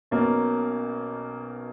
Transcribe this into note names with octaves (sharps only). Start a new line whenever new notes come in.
B1 B2 A#3 C#4